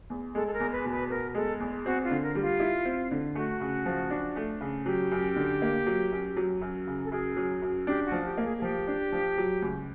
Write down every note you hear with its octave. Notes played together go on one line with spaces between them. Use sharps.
E2
G#3 A4
A4
A#4
E2
B4
B2
B4
B3 A#4
G#3 A4
E2
C4 F#4
F4
D3
A#4
G3
F4
E4
C4
D3
A3 F#4
C#3
F3
D4
A3
C#3
F#3 G4
F#2
D3
A#3
F#3
F#2
F#3
F#2
C#3
A4
F#2 G#4
F#3
F#2
D4 G4
F#4
F3
G4
A#3
G#4
G#4
F3 G4
D4
F3
F#3
C#2